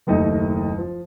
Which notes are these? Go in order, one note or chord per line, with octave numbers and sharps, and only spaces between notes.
F#1 D#2 A3 D#4 D#5
F3